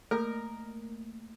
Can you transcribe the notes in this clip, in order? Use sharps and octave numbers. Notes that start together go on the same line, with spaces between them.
A3 A#3 A#4 D#6